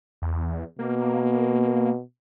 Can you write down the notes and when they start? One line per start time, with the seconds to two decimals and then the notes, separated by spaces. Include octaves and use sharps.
0.22 E2
0.79 B2 A#3